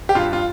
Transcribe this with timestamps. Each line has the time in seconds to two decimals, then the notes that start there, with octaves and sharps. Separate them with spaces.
0.09 G4
0.15 G2 F4
0.33 F4